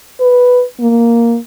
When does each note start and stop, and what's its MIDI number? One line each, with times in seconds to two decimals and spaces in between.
0.20 0.63 71
0.80 1.37 58